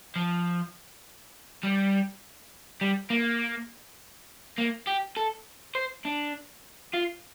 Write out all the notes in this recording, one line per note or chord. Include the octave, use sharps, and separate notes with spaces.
F3
G3
G3
A#3
A#3
G4
A4
C5
D4
F4